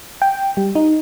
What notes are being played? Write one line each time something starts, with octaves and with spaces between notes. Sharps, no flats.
G5
G3
D#4